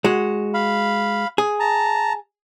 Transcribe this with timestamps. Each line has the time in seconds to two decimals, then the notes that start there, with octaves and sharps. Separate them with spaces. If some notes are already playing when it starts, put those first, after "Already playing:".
0.04 G#3 F#4
0.54 F5 B5
1.38 G#4
1.60 A5 A#5